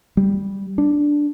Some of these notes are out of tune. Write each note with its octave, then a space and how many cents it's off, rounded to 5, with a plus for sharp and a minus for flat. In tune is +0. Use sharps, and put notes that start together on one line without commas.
G3 +5
D4 +0